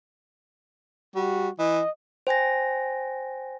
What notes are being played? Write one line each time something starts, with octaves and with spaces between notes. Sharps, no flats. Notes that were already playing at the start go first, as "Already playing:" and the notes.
G3 F#4
E3 D#5
C5 G5 G#5 A#6